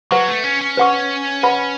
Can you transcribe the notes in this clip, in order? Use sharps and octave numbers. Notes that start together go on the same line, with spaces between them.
F#3 B4 F#5 C#6
A3
C#4
C#4
B4 F#5 C#6
B4 F#5 B5